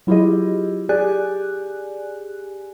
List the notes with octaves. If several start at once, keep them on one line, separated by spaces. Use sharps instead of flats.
F#3 E4 F4 G4 G#4 D#5
G4 G#4 D5 G#5 F#6